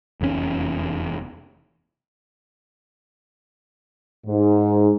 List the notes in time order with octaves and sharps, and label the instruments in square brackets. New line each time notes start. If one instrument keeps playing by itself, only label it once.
[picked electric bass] F1 E2 B2 C#4
[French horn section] G#2